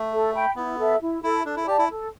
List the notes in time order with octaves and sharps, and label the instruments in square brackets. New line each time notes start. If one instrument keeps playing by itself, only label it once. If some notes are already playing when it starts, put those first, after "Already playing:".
Already playing: [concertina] A3
[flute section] A4
G5 B5
[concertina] B3 [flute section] E4
[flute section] A4 E5
E4
[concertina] E4 [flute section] A4 E5
[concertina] D4 [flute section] A4
[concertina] E4
[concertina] G4 [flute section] D5 A5
[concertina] E4
[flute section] A4